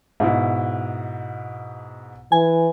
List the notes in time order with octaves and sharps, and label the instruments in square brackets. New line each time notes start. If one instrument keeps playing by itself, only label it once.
[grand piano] G#2 B2 E4
[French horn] E3 [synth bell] G#5